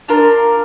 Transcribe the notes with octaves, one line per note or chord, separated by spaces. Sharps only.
D4 F4 A#4